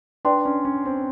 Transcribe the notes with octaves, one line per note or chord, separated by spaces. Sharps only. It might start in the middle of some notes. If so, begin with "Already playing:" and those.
D4 B4 D5 G5 C6
C#4
C#4
C4